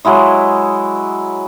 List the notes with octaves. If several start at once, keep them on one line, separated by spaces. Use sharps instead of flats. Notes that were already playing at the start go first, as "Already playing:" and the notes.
F#3 G#3 E4 D#5